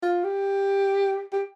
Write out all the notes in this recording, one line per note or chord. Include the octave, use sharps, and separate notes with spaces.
F4
G4
G4